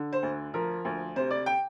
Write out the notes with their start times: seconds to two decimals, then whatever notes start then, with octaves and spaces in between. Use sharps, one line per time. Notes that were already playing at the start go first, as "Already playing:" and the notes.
Already playing: D3
0.13 C5
0.23 D2
0.54 F3 A#4
0.85 D2
1.16 C3 C5
1.31 D5
1.46 G5